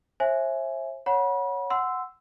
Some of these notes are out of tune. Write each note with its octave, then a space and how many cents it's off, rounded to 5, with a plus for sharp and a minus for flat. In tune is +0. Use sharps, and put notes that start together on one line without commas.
C5 +40 E5 +0 G#5 +5
C#5 +0 F#5 -10 B5 -35
F#5 +0 C6 -20 E6 +0